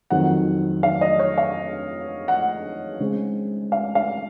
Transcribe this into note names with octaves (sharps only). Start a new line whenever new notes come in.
F2 D#3 F#3 C4 F#5
F5
D#5
C#5
F5
F#5
C#3 G#3 C4
F5
F5